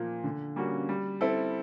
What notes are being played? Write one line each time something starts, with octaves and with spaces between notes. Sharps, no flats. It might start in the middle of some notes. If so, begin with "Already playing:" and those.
Already playing: A#2 F3 A#3
D3
G3 A#3 C#4 F#4
G3
C4 E4 A4